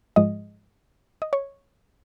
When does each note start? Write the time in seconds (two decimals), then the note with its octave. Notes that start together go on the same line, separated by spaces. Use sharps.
0.16 G#2 F3 G#3 D#5
1.22 D#5
1.33 C#5